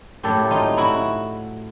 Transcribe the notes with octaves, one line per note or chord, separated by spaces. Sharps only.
A2 F#3 A3 G4 A4
D#4 F4
E4 F#4